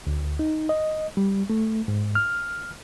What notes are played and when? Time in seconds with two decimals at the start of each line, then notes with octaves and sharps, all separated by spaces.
0.07 D2
0.39 D#4
0.69 D#5
1.17 G3
1.50 A3
1.88 G#2
2.15 F6